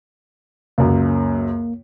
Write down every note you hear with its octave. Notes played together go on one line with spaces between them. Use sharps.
C#2 F#2 A#3